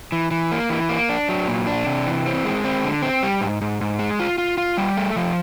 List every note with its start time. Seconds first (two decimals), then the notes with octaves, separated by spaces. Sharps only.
0.12 E3
0.31 E3
0.52 A#3
0.70 E3
0.89 A#3
1.09 D4
1.29 F#3
1.47 A#2
1.67 D4
1.86 C3
2.06 E3
2.26 C4
2.45 G#3
2.64 C4
2.84 D3
3.02 C4
3.23 G3
3.41 G#2
3.61 G#2
3.81 G#2
3.99 G#3
4.20 F4
4.38 F4
4.58 F4
4.78 G3
4.97 A3
5.16 F3